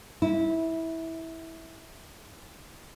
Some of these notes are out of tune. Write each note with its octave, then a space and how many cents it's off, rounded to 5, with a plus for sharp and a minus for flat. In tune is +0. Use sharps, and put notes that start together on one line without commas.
E4 -15